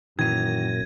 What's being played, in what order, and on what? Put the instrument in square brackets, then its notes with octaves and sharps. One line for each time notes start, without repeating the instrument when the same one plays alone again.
[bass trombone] F#2 [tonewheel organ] A#2 A#6 [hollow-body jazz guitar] D#3 E3 [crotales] G#6 D#7